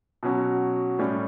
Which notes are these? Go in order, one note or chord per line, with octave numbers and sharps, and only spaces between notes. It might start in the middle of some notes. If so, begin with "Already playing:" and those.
B2 F#3 C#4 F#4
A2 G3 C#4